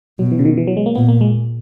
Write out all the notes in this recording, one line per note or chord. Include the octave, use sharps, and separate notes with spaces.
B2 F#3
E3
C#3
D#3
E3
F#3
G#3
A#3
A#2 B3
A#3
G#3